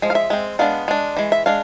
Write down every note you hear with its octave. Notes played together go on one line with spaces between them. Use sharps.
F3 G#3
F5
E5
G#3 C4
G#3 B3 D4 F5
G#3 D4
E3 G#3
E5
G#3 D4 F5